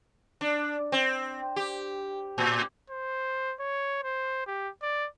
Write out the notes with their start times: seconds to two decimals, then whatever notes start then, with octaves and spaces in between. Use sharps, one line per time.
0.41 D4
0.92 C4
1.56 G4
2.38 A2
2.90 C5
3.60 C#5
4.03 C5
4.47 G4
4.82 D5